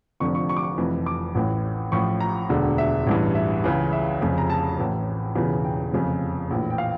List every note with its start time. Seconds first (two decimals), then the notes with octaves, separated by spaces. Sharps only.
0.20 F1 F2 D3 F3 C#6
0.35 C#6
0.49 C#6
0.57 D6
0.63 C#6
0.78 F1 F2 E3
1.06 D6
1.35 A1 A2 E3
1.92 A1 A2 F3 C#6
2.20 A#5
2.49 E1 D2 D3
2.78 E5
3.07 A1 G2 E3
3.35 E5
3.64 C#2 C#3 E3
3.92 E5
4.21 F1 F2 C#3
4.38 A#5
4.50 A5
4.78 A1 A2 E3
5.35 E1 E2 C#3 E3
5.64 G5
5.93 F1 F2 C#3 F3
6.50 A#1 A2 E3
6.70 G5
6.78 F5